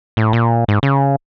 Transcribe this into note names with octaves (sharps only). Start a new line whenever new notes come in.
A2
A#2
G#2
C#3